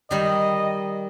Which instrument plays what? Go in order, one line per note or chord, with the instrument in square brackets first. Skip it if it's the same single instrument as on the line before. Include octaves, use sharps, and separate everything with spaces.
[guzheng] D#3 G3 [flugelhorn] D#5